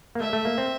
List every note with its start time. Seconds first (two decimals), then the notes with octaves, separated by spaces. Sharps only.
0.15 A#3
0.20 A3 E5
0.33 A3
0.45 A#3
0.58 C4